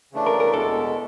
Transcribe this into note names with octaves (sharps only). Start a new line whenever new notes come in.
C#3 E3 A3 D4
A#4
A#4
E2 B2 G#3 A4